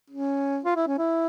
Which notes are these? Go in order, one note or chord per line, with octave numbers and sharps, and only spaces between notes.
C#4
F4
E4
C#4
E4